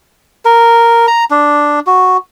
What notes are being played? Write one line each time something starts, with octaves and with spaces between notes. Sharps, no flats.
A#4
A#5
D4
F#4